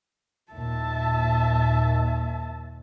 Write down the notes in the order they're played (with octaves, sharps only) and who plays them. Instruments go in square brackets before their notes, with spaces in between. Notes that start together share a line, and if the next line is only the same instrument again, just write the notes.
[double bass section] D#2 A#2 [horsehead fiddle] E5 A5